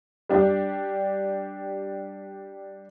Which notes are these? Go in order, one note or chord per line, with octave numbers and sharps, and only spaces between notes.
G3 D4 G4